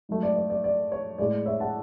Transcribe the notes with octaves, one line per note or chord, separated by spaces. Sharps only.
G#2 F#3 A3
D5
D5
D5
D5
C#5
A2 G#3 D5
C#5 E5
F#5 A5